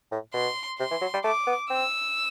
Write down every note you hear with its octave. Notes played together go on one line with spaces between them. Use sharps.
A2
B2 C6
C3 C6
E3
F#3
G3
A3 D6
B3
C4 E6